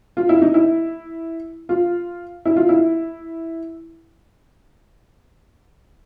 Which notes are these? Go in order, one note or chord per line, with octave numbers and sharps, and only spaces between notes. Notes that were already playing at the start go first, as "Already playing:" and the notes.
F4
E4
D#4
E4
F4
E4
F4
E4